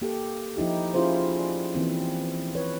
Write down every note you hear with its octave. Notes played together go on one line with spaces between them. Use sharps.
A#3 G4 A4
F3 D#4 E4 G4
C#4 E4 F4 G#4 C5
D5
E3 A#3 C4 E4
B4 C#5